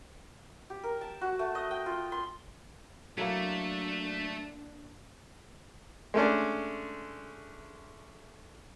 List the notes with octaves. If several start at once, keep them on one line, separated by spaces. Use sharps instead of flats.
G4
A#4
A5
F#4
A3
D#5
G5
F4
C6
F#3 A3 A#3 D4 E4 A4
G#3 A3 C#4 D4